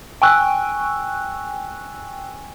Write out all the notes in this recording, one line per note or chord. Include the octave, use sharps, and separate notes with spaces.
G5 G#5 C#6 E6 F#6